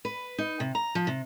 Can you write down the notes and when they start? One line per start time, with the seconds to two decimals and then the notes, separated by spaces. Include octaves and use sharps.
0.05 B4
0.38 D#4
0.60 C3
0.75 A#5
0.95 F3
1.07 C3